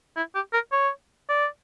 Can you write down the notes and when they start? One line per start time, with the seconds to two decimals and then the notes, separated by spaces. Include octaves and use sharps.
0.17 E4
0.35 G4
0.53 A#4
0.72 C#5
1.29 D5